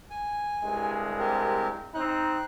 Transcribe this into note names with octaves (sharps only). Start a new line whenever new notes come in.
G#5
C2 G2 G#3
C4 G4 A#4
C4 D#4 F#6